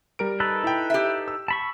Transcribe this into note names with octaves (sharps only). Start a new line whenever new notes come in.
G3 A#4 D7
D#4 A4 B4
E4 G5
G4 E5
E6
A5 B5 C#6